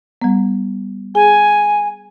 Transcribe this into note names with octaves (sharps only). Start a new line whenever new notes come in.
G3 B3
G#4 G#5